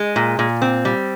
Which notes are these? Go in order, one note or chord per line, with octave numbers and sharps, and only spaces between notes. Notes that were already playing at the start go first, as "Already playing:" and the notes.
Already playing: G#3
A#2
A#2
C4
G3